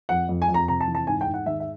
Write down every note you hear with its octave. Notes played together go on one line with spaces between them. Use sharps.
F2 F#5
F2
G#5
F2
A#5
C3 A#5
A5
E3
A5
G#2 G#5
G5
G#2
F#5
D#3 E5
E5